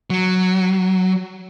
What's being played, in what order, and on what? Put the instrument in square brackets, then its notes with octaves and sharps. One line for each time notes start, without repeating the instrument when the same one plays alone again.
[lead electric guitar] F#3